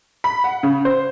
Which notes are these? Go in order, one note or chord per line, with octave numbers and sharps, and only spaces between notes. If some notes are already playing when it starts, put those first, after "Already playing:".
B5
F#5
C#3
C5